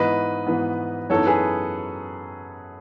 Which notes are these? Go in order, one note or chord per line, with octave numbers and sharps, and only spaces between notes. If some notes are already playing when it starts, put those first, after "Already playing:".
Already playing: G#2 E3 B3 B4 D#5
G#2 E3 B3
F#2 E3 B3 D#4 A4 C#5
G#4 B4